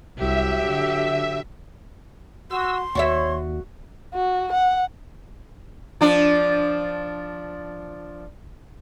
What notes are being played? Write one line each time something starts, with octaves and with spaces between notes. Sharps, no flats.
C2 F#3 G4 E5
D3
F#4 C6 E6
D#2 F#4 C#5 D5 E5
F#4
F#5
F3 D4